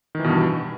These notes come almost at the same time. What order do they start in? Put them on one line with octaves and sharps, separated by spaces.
D#3 E3 B2 G2